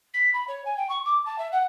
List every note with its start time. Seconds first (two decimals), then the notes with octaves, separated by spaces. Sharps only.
0.13 B6
0.33 B5
0.47 C#5
0.65 G#5
0.77 G5
0.89 C#6
1.05 D6
1.25 A5
1.38 E5
1.52 F#5